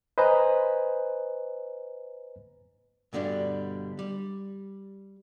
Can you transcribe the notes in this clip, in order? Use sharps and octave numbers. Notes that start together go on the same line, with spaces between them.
B4 C5 D#5 G#5 A#5 B5
G2 B2 D3 G3 D4
G3